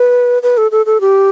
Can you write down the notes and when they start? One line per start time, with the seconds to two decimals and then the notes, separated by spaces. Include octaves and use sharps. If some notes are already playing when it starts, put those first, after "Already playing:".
Already playing: B4
0.43 B4
0.57 A4
0.71 A4
0.86 A4
1.01 G4